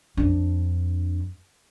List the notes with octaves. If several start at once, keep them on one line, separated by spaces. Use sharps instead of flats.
F2 D4